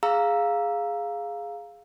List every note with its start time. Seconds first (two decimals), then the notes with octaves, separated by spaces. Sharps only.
0.03 G#4 F5 A#5 E6